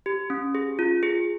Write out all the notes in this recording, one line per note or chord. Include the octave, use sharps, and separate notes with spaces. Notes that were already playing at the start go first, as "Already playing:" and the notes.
G4
C#4
G#4
F4
G#4